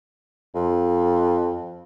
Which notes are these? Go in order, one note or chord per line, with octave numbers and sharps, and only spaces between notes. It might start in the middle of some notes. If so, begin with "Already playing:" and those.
F2